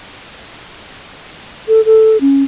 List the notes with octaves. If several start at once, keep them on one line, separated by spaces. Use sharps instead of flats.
A4
A4
C#4